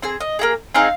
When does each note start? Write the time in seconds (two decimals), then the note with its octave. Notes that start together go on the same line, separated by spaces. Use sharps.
0.02 C4 G#4 G#5
0.20 D#5
0.39 A#3 D#4 G#4
0.74 C4 D#4 G#4 F5